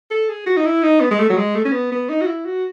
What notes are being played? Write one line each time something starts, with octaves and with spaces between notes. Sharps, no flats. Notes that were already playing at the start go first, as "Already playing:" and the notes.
A4
G#4
F#4
D#4
E4
D#4
B3
G#3
A3
F#3
G#3
A3
C#4
B3
B3
D#4
F#4
E4
F#4